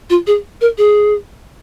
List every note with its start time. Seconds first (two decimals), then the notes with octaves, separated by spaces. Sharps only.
0.10 F4
0.27 G#4
0.61 A#4
0.78 G#4